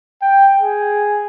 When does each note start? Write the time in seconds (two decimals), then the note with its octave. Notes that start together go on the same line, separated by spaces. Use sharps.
0.22 G5
0.61 G#4